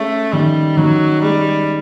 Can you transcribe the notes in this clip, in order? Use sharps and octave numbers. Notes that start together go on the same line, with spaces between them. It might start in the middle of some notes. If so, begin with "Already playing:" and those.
Already playing: G#3 A3 C#4
D#3 G3
D#3 F#3
G3 G#3